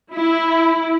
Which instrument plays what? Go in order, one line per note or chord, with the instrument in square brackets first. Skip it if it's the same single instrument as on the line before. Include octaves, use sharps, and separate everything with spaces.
[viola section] E4